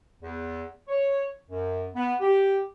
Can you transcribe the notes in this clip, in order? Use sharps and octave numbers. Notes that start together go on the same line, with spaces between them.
E2
C#5
F#2
B3
G4